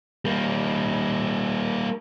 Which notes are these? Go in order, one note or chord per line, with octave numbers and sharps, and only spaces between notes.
G3 A#3